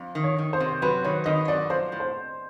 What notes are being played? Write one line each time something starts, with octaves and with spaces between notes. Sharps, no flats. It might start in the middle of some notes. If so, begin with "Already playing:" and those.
Already playing: F2
D#3
C#5
D#3
C5
C3
F#3 B4
D#3 C#5
D#3 D#5
F#3 D5
F3 C5
A2
C5